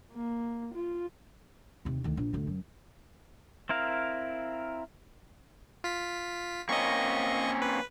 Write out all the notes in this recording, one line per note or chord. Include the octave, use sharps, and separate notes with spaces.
A#3
F4
D#2 C3
D2 D#3
A#1
D2 A2
F#2
C4 E4 A#4 F5
F4 B6
A#3 C4 C#4 D#5 C#6
B4